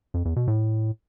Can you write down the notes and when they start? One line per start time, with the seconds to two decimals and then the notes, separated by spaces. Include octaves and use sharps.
0.14 F2
0.25 E2
0.36 B2
0.47 A2